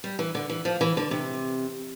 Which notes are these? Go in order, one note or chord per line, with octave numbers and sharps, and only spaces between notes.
G3
E3
D3
E3
F3
E3
D3
C3